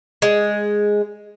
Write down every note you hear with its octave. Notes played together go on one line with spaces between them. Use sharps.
G#3